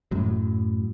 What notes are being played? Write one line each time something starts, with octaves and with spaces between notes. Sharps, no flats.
F#2 A2 F#3